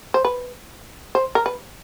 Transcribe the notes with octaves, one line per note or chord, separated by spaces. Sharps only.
C5
B4
C5
A#4
B4